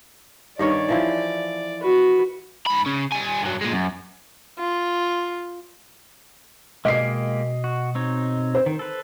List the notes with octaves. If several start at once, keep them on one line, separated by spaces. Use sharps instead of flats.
G2 D#3 C#5 D5
E3 F3 E4
F#4 B4
G#2 B5
C#3
G3 G#5
G2 F#3
A#2 G#3
F#2
F4
B2 G#3 A#3 G4 D#5 C7
F#4
C4 D#4 C#5
C5
D#3
A4 B4